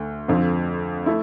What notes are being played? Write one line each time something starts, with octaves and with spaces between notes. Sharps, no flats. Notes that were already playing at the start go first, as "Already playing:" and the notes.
Already playing: D2 A3
F2 D3 F3 C4
A3 E4